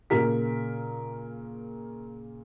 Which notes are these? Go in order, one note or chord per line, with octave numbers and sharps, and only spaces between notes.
A#2 C#3 A#4 B6